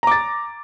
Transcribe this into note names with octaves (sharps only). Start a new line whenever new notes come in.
A#5 D6 A6